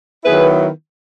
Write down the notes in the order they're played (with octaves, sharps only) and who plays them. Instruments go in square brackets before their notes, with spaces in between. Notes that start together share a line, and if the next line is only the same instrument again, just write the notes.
[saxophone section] D#3 F#3 B3 E4 G#4 B4